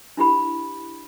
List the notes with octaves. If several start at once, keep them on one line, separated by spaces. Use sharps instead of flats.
D4 E4 G4 B5